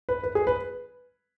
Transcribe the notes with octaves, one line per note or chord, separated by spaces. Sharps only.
B4
B4
G#4
B4